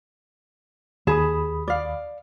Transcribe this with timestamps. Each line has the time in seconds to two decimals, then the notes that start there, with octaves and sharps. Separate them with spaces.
1.07 D#2 G#4 A5 B5 D#6
1.68 D5 F5